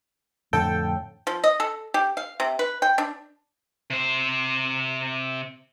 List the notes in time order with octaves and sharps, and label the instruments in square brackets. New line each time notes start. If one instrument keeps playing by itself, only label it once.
[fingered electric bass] F2 A2 D3 [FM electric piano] A4 G5
[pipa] F3
D#5
A4
G4
F5
C3
B4
G5
D4
[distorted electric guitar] C3 C5